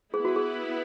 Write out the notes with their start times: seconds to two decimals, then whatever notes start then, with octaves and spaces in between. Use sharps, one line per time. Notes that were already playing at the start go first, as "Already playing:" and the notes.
0.14 B3 E4 G#4 B4
0.25 F#4
0.36 G#4